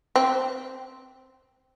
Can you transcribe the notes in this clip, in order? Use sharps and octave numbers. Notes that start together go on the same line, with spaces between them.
C4